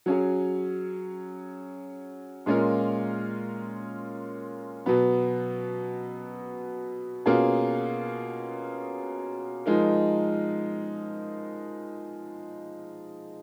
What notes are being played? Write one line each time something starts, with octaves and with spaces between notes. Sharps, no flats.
F#3 C#4 G#4
A#2 G#3 C#4 F4 A#4
B2 F#3 B3
B2 A#3 C#4 F4 G#4
F3 G#3 D#4 A#4